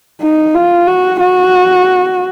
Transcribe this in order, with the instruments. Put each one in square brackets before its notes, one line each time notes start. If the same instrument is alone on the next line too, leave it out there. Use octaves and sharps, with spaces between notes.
[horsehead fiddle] D#4
F4
F#4
F#4